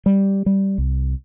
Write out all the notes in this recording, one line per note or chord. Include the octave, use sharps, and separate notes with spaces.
G3
G3
C2